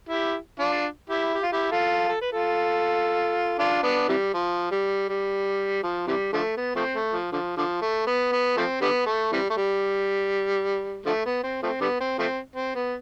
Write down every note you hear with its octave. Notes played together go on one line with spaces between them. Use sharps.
E4 G4
D4 F4
E4 G4
G4
F4
E4 G4
F4 A4
A4
B4
F4 A4
D4 F4
B3 D4
C3 E3 G3
F3
G3
G3
F3
C3 E3 G3
D3 F3 A3
B3
F3 A3 C4
A3
F3
D3 F3
D3 F3
A3
B3
B3
F3 A3 C4
D3 G3 B3
A3
C3 E3 G3
A3
G3
D3 F3 A3
B3
C4
F3 A3 C4
D3 G3 B3
C4
F3 A3 C4
C4
B3